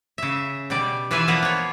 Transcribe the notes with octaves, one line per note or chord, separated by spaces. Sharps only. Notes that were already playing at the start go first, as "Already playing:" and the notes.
C#3 E5
B2 G3 D5
E3 F4 B4 E5 G#5
F3 A#3 B3 A#4 B4
F4 C#5